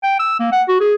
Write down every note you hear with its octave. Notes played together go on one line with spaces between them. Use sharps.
G5
E6
A#3
F#5
F#4
G#4